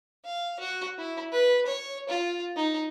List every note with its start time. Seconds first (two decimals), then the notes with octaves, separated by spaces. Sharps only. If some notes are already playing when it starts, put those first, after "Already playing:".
0.25 F5
0.60 F#4
0.98 E4
1.32 B4
1.66 C#5
2.09 F4
2.56 D#4